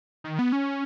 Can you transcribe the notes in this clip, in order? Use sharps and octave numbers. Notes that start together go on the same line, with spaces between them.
D#3
B3
C#4